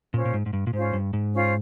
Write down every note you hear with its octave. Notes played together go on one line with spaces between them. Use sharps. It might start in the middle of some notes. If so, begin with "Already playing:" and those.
A#2 C#4 F4 C5
A#2
G#2
G#2
G2
A#2
G#2 C#4 F4 C5
G2
G#2
C#4 F4 C5